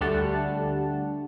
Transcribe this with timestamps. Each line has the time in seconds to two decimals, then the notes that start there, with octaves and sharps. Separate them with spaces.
0.01 D2 G3 A3 D4 F#5 A5